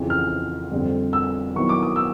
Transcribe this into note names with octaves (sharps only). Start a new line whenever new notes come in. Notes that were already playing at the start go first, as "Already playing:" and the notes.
Already playing: F2 C#3 E3
F6
F2 D3 G3 C4
E6
D#3 F#3 B3 E4 C#6
D6
D#6
E6